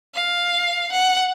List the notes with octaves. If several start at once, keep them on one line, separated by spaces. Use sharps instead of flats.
F5
F#5